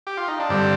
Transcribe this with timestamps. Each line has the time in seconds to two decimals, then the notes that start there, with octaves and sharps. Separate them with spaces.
0.07 G4
0.17 F4
0.28 D#4
0.39 D4
0.49 G2 D3 G3 C4